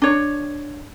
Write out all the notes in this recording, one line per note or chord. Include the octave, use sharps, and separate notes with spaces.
D4 C#5